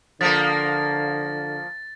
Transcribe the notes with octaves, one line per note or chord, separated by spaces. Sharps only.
D3 F3 A#3 A6